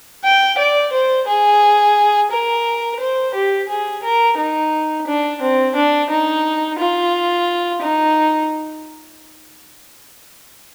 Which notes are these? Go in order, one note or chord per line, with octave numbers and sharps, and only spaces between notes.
G5
D5
C5
G#4
A#4
C5
G4
G#4
A#4
D#4
D4
C4
D4
D#4
F4
D#4